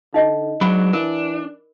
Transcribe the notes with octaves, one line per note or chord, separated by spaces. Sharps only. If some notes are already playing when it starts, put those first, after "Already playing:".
D3 D#4 D#5
G#2 F#3 D4 B5
E3 D4 A#4